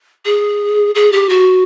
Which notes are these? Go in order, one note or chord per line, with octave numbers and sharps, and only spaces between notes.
G#4
G#4
G4
F#4